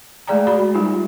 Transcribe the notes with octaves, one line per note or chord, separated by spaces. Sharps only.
G#3 A3 G#4 D5 G5 A#5
F#4 D5 B5
G3 D#4 F4 G4